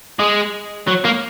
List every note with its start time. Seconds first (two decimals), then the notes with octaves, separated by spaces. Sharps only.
0.19 G#3
0.87 F#3
1.05 A#3